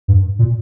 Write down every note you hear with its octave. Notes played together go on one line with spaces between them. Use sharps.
G2
A#2